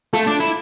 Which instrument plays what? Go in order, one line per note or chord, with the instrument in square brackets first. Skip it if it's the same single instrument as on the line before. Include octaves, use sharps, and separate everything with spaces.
[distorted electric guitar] A3 [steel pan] F4 A4
[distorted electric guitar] D4
E4